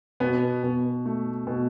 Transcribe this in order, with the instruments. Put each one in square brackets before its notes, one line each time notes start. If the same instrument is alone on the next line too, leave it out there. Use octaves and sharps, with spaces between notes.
[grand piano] B2 [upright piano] B3
[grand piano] B2
A3
B2